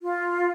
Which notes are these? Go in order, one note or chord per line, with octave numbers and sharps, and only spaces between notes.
F4